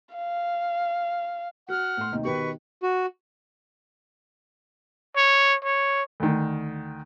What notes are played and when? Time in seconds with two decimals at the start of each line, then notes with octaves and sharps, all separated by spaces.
0.15 F5
1.69 F#4 F#5 F6
1.97 A2 C6
2.12 D#2 C3 D#4
2.25 B2 D#3 G4 B4 C#6
2.83 F#4
5.17 C#5
5.64 C#5
6.20 D2 D#3